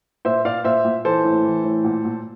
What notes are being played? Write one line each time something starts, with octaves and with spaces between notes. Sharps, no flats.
A#2 C5 E5
A#2 D5 F5
A#2 C5 E5
A#2
E3 A4 C5
A2
E3
A2
A#2
A#2